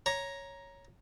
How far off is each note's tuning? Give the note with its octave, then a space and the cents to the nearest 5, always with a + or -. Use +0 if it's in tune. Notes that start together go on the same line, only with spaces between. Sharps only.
C#5 +0 A#5 +10